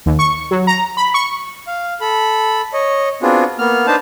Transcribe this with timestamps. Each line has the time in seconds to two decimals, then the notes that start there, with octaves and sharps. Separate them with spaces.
0.06 D#2
0.19 C#6
0.51 F#3
0.67 A#5
0.97 B5
1.14 C#6
1.67 F5
2.01 A4 B5
2.73 C#5 D#5
3.22 B3 C4 D4 F4 F#4 G#4
3.59 A#3 B3 F6
3.87 D4 D#4 B4 C5 A5